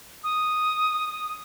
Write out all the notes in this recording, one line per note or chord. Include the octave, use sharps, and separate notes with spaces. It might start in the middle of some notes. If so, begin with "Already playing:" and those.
D#6